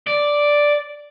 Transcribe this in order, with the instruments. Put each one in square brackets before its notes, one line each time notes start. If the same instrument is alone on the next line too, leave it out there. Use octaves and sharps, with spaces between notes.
[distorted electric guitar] D5